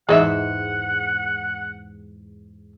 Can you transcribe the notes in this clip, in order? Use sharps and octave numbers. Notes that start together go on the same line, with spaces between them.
E2 G#2 G#4 D#5 E5 F#5